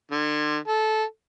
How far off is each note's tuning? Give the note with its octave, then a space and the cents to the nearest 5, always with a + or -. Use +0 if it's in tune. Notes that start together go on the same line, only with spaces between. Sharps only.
D3 +35
A4 -15